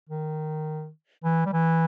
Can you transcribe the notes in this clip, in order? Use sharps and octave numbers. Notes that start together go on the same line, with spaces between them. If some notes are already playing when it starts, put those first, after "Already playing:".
D#3
E3
G3
E3